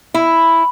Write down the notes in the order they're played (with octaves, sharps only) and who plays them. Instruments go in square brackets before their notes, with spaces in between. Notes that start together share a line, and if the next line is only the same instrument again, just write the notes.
[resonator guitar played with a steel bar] E4